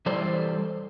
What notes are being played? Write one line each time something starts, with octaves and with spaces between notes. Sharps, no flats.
E3 G3 A4 C5 D5